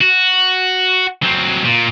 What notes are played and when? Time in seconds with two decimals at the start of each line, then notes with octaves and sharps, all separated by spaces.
0.01 F#4
1.23 F#3 C4
1.65 A#2